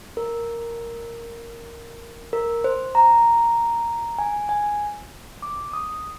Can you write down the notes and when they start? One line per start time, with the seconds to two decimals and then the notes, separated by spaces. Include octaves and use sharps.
0.17 A#4
2.33 A#4
2.64 C5
2.95 A#5
4.19 G#5
4.49 G#5
5.42 D6
5.73 D#6